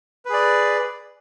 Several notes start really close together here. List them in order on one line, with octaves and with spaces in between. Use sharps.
B4 G#4 D5